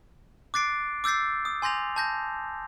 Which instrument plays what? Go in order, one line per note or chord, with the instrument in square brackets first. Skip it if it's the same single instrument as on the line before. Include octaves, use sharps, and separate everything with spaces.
[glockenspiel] D6 F#6 A6 C7 D7
D6 E6 G6 A6 C7
D#6
G#5 C6 G6 A#6 F7
A5 G6 A#6